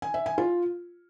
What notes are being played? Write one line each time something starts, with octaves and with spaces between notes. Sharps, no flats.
G#5
E5
G#5
F4